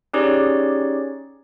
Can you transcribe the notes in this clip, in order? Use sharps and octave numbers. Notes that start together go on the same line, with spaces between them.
C#4 D#4 G4 G#4 C#5 D5